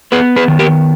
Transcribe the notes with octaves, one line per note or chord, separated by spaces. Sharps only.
B3 G#4 B4
G#4 B4
D#3
G4 A#4